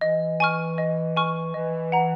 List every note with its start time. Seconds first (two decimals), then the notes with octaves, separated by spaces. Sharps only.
0.01 E3 D#5
0.40 G#5 C#6 F6
0.78 D#5
1.16 G#5 C#6 F6
1.54 E3 D#5
1.92 F#5 A#5